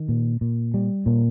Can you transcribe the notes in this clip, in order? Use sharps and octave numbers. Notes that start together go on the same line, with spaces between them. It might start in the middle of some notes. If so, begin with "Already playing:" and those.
Already playing: D#3
A#2
A#2
G3
A#2